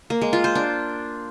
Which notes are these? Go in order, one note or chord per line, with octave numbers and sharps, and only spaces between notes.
A#3
G#3
F4
C5
D4